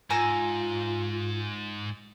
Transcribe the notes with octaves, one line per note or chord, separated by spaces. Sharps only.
G#2 F4 G#5 A#5 E6